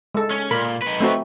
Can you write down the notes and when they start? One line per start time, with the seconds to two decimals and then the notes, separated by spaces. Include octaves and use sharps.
0.15 G#3 A4
0.31 C#4
0.51 A#2 A#4 B5
0.82 D#4 B4
1.00 A3 C4 F#4